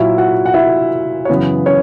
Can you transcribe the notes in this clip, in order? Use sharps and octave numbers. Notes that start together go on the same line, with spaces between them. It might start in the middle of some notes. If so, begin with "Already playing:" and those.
Already playing: A#2 F#3 E4 E5
F#4 F#5
F#5
E4 E5
C#5
F#2 C#3 E3 B3 B4
C#4 C#5